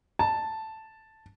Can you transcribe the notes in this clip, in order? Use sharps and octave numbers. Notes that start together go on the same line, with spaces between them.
A5